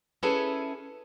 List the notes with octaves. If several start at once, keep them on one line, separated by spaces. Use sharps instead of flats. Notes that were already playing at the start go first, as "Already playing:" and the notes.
C#4 E4 G#4 A4 B4 C#5